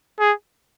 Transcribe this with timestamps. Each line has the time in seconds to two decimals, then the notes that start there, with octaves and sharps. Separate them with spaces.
0.19 G#4